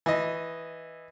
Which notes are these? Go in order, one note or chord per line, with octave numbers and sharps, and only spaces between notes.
E3 D#5